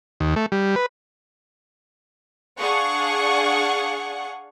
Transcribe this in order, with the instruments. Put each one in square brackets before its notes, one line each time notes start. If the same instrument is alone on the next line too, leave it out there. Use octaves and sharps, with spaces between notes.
[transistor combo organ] D#2
A3
G3
B4
[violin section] D4 G#4 F5 F#5 C#6